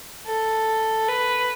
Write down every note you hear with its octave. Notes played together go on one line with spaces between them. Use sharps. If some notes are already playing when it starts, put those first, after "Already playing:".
A4
B4